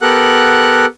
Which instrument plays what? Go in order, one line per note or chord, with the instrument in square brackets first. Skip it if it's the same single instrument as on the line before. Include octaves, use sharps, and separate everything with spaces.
[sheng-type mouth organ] B3 G4 A4 A#4 F#5 F#6